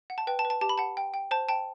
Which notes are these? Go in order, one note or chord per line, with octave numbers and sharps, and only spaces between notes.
F#5
A5
B4 G5
A5
B4
A5
G4 A5
B5
F#5 A5
G5
G5
C5 A5
G5 A5